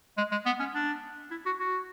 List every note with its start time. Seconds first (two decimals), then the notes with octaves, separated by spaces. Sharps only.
0.18 G#3
0.32 G#3
0.46 B3
0.60 C#4
0.75 D4
1.31 E4
1.46 F#4
1.60 F#4